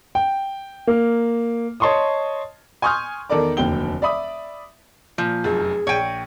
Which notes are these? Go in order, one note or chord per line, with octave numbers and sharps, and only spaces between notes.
G5
A#3 F6
C#5 D#5 A5 C6 C#6 D#6
G#5 C6 C#6 D#6 F6 G6
E2 D#3 A4 A#4 D5 D6
F1 D#2 D3 F#3 G5 G7
D5 E5 B5 D#6
A#2 F3
F1 F#2 G#4
A#1 C#5 G5 D#7